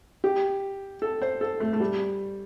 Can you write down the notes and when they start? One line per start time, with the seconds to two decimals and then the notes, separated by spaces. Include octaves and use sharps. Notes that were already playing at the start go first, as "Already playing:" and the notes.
0.24 G4
1.02 A4
1.22 C5
1.41 A4
1.60 A3
1.73 A3
1.80 G3